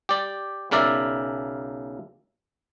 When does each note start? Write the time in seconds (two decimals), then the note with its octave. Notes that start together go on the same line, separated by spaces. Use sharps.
0.09 G4 D5
0.71 B1 C#3 A#4 D5 E5